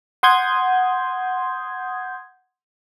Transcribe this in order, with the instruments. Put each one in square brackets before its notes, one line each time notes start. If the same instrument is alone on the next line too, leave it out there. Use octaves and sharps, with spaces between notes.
[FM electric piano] F#5 C6 D#6 G6 G#6